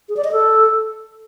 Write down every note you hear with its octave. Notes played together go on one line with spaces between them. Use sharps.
G#4
D5
D#5
A4